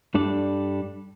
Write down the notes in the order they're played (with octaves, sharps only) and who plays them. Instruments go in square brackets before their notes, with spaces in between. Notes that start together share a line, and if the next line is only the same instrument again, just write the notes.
[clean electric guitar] G2 G3 D4 A4 D5